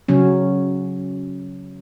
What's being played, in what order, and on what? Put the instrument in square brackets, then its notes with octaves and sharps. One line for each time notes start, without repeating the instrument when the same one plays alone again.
[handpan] C#3 F#3 C#4